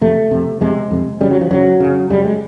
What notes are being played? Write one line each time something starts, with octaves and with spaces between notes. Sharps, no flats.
F2 C3 A3
F2 C3
F2 C3 G#3
F2 C3
F#2 C#3 G3
F#3
F3
F#2 C#3 F#3
F#2 C#3
F#2 C#3 G3
G#3